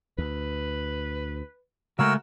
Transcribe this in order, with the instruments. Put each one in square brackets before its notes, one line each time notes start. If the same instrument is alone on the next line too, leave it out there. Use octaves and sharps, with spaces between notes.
[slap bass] D2 [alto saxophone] B4
[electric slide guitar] C#3 G#3 A3 [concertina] F#4 A#4 E6